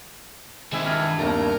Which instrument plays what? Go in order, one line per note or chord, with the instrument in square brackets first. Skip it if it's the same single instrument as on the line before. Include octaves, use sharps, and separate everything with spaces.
[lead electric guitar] D#3 E5 [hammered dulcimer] G#3 E4 [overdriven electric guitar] C4 G#4
[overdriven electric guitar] G2 [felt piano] F6
[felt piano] G1 D#2 C3 [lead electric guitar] A#4 [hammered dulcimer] A5